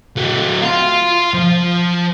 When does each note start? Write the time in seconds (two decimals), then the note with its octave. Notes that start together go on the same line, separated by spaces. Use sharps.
0.17 F#3 A3
0.62 F5 C6
1.34 F3